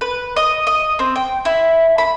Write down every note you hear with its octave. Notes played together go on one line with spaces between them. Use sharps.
B4
D#5
D#5
C4
G5
E4
B5